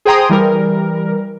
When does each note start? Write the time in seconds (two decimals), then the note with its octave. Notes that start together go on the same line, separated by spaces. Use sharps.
0.05 G#4 C5 G5 A#5 C6 D#6
0.29 E3 G3 A#4